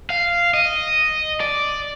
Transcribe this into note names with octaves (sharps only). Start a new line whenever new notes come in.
F5
D#5
D5